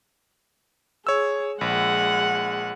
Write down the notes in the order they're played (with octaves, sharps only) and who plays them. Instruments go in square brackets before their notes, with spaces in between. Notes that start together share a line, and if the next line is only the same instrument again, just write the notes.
[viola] G#4 [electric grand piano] C#5 E6
[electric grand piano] A#1 [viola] G#3 F#5